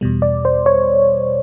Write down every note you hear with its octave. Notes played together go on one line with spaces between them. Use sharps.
E2 B2 G3
D5
C5
C#5